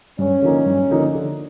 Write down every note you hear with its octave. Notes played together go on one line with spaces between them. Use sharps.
G2 C#4
D3 F3 A#3 D#4
G2
D3 F3 A#3 D#4
D3